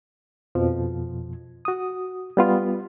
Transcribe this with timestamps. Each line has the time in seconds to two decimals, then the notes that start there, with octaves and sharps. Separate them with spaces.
0.55 F2 B2 F3
1.65 F#4 D#6
2.37 G3 B3 F4